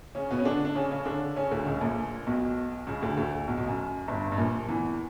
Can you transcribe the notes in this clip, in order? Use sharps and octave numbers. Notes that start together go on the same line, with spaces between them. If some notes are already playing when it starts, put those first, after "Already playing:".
C#3 C#4
B2 B3
C#4
D3 D4
D4
C#3 C#4
C#3 C#4
D3 D4
C#3 C#4
D2 D3
C#2 C#3
A#1 A#2
B1 B2
C#2 C#3
D2 D3
D2 D3
B1 B2
B1 B2
F#2
G1 G2
G2
A#1 A#2
E2 E3